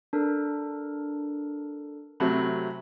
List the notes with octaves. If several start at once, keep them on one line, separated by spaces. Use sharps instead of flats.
D4 A4 A#4
C3 F#3 A3 B5